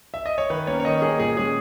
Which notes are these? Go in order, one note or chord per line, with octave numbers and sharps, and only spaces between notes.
E5
D#5
C#5
D#3 B4
A#3 C#4 C#5
C#5
D#3 D#5
A#3 C#4 G#4
A#2 G#4
G#3 C#4 G#4